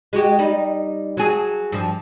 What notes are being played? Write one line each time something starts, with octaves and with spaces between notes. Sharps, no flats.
G#3 F#4 G4
G3 D#4
F#3 G#4
G2 F3